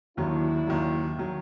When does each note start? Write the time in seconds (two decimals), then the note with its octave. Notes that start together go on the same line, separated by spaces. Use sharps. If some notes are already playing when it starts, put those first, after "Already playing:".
0.17 D#2 D#3 F#3 D4 E4
0.67 D#2 D#3 F#3
1.18 D#3 F#3